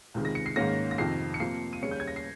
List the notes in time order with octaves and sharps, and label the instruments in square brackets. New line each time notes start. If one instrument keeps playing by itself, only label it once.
[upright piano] C#2 C3 D#3 G#3
A#6
C#7
C7
G#2 D#3 A#3 C#4 A#6
A#6
F2 C3 D#3 C7
C#7
C3 F3 A#3 C7
D#7
D#2 C#3 G3 C#4 C#7
G6
G#6
A#6
C7